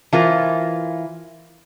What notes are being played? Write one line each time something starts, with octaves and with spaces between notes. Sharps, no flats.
E3 F4 A#4 C5